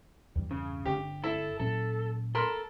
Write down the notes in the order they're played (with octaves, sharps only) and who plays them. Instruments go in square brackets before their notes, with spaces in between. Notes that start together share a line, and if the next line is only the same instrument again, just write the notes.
[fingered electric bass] E2 G2 G3
[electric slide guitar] C#3
[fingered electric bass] G1 D3 [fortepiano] G4
[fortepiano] E4 [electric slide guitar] A4
[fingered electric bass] A#2 F#3 C#4 [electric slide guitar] A4
[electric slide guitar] A4 [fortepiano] A#4 B5 C6